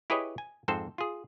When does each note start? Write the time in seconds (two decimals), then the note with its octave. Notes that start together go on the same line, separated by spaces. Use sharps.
0.10 E4 G4 G#4 B4 C#5 D#5
0.38 G#5
0.68 F2 G#2 C4 A4 C5
0.98 F4 G#4